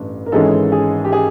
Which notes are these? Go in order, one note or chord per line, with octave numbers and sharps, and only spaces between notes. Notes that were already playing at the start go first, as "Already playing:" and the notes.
Already playing: A1 G2
A#4
G#1 G#2 E3 G#3 C#4 A4
G#4
G4
G#4